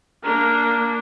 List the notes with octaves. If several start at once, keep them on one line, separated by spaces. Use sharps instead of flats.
A#3 D4 A#4